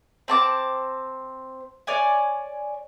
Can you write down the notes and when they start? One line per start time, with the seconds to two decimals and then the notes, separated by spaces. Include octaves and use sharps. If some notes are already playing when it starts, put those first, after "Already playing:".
0.28 C4 A5 D6
1.87 C#5 D5 G#5